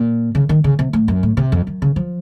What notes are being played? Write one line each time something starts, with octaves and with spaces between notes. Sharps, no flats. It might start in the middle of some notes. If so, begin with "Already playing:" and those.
Already playing: A#2
C#3
D#3
C#3
C3
A2
F#2
A2
C3
F2
F#2
C#3
F3